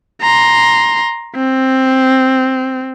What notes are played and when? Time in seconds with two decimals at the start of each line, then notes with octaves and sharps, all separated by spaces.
0.22 A#5 C6
1.36 C4